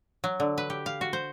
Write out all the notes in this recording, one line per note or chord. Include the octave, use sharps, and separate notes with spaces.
F#3
D3
B4
G4
F5
F#4
C5